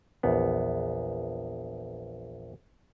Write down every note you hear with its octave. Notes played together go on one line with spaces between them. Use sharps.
A#1 E2 B3